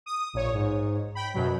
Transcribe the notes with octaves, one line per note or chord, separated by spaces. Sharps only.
D#6
A#1 C#5
G#2
G5 B5
F#2 B2 F#3